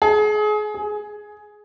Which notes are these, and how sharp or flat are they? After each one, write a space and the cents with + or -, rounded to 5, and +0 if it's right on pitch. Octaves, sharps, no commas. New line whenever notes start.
G#4 +30
G#4 +10